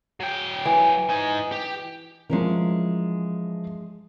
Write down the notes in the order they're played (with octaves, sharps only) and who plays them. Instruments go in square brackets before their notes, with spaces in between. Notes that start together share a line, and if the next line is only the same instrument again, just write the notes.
[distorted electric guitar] F#3 G5
[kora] E3
[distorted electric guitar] D#4 G#5
G4
[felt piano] E3 F3 [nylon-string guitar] G#3 C#4 A#4